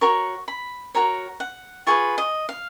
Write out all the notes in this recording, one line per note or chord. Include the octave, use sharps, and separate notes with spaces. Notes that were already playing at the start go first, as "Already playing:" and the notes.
F#4 A#4 C#5 C#6
B5
F#4 A#4 C#5 A#5
F#5
F4 G#4 B4 C#6
D#5
F5